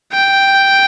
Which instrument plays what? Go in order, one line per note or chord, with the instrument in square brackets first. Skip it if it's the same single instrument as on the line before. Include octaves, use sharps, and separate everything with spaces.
[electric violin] G5